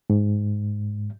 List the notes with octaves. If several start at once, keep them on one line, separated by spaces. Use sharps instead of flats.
G#2